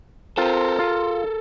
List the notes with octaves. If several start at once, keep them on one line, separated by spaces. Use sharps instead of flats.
C4 F4 A4 A#4 C5
F4